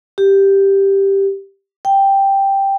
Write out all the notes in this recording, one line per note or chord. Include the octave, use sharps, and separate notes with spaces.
G4
G5